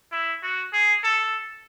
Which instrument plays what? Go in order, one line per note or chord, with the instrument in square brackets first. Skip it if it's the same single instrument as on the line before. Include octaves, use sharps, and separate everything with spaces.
[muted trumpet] E4
F#4
G#4
A4